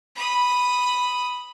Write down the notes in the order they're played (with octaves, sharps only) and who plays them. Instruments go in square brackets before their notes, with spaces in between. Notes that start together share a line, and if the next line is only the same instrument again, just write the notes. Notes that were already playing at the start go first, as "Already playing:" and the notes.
[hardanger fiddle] B5 D#6